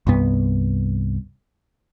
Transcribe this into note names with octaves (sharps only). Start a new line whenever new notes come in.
C2 G2 B3